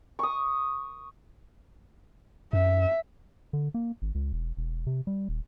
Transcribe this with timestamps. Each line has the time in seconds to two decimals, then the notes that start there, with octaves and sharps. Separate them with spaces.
0.19 C#6 D#6
2.53 F#2 E5
3.53 D3
3.74 A#3
4.02 G#1
4.15 C#2
4.33 E1
4.57 E1
4.87 C3
5.07 G3
5.29 D#1